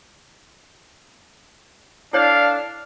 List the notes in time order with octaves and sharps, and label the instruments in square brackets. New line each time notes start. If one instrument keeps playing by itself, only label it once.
[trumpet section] D4 A4 F5 [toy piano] E4 C#5 D5